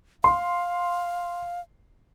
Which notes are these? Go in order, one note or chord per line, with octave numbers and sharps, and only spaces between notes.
F5 C6